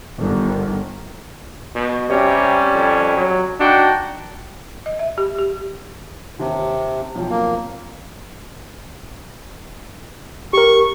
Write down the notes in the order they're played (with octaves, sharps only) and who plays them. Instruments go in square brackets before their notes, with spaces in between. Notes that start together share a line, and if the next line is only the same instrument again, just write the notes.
[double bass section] G1 D3 D#3
[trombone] B2
[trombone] C3 [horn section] G3 C#4
[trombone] F2
F#3
[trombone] D4 [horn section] D#4 F#4 G5
[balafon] D#5
E5
G4
G4
[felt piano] D#2 [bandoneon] C3
[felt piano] B1 F3 C4
[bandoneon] A#3
[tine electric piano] G4 A#4 [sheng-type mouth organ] C#6